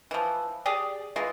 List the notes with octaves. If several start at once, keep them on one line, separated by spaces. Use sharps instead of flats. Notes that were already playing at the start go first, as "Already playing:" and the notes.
E3 F3
G4 G#4 D5
E3 G#3 F4